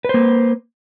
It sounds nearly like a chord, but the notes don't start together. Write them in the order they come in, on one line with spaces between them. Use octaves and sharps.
B4 C5 A#3